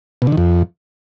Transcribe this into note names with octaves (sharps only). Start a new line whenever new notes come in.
B2
D3
D#3
F2